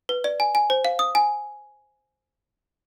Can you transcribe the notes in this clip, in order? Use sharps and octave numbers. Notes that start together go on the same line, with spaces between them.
B4
D5
G#5
G#5
C5
F5
D#6
G#5